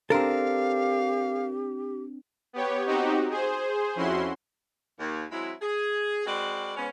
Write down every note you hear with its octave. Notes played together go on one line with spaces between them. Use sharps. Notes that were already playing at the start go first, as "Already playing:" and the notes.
C4 D4 G4 A4 A#4 F5
B3 G4 C#5
C4 D#4 F#4 G4
G#4 C5
F2 C#4 E4 F#4 C6
D#2
F#3 G#3 C4 E4
G#4
G#3 C4 F#4 A#4 B4 D5
G#2 B3 C#4